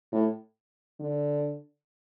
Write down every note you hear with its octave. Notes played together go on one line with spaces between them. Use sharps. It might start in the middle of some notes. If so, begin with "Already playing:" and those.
A2
D3